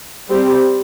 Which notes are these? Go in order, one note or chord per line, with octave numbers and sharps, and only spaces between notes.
G3 C4 G4